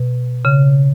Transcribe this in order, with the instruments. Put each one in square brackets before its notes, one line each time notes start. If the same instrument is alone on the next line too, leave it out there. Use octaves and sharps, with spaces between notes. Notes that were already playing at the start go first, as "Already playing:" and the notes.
Already playing: [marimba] B2
C#3